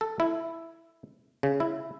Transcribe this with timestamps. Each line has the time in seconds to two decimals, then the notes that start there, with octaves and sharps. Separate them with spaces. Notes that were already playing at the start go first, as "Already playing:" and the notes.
0.01 A4
0.20 E4
1.43 C#3
1.60 E4